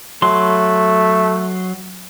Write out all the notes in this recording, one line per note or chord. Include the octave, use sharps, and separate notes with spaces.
F#3 A3 C6